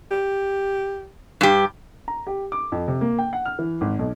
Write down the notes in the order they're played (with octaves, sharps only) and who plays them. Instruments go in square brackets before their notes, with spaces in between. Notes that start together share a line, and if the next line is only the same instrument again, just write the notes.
[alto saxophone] G4
[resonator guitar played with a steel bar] G2 G4
[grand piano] A#5
G4
D6
F2
C3
A#3
G5
F#5
F6
E3
G#1
B1